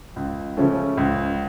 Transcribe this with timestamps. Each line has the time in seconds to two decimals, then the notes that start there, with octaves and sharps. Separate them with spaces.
0.16 C#2
0.57 C#3 F3 A3 C#4
0.97 C#2